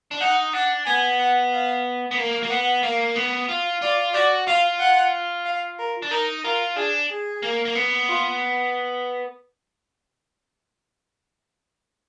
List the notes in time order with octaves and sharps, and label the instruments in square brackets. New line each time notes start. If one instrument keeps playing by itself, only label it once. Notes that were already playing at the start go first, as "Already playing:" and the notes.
[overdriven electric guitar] D4
[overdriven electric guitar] D#4 [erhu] F#5
[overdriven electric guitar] D4 [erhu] F#5
[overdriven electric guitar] B3 [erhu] G#5
[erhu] F#5
F5
[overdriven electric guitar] B3
A#3
A#3
[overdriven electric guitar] B3 [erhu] F#5
[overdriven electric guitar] A#3 [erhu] F5
[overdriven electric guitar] B3
F4
[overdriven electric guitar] F4 [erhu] D5
[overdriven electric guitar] F#4 [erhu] D5
[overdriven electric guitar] F4 [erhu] F5
[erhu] F#5
F5
A#4
[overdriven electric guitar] D4
[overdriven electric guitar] D#4 [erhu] A#4
[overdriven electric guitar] F4 [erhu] A#4
[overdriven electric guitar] D4 [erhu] G#4
[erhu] G#4
[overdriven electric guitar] A#3
A#3
B3
[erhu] F4